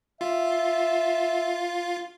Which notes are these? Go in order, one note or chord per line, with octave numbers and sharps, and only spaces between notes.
F4 E5